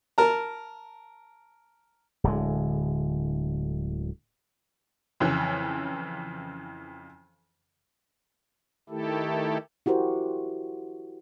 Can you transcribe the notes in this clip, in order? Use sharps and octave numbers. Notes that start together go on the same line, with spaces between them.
A#4 A5 A#5
D1 D3 G#3
F2 C#3 E3
D#3 A3 E4 G4 A4
E4 F#4 G4 A#4 C5